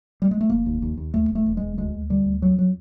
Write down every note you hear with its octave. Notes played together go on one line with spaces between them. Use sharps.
G3
G#3
A3
F1 A#3
D#2
D#2
D#2
D#2 A3
E1
A3
E1
E1 G#3
D2 G#3
D2
D3 G3
D2
F2 F#3
F#3